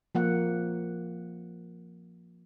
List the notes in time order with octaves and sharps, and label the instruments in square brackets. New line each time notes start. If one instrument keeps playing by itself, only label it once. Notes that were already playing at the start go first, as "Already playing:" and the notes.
[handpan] F3 A#3 F#5